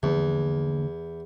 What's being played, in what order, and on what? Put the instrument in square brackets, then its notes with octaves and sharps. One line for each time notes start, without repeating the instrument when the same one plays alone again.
[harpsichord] E2 [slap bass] D3 F3 A#3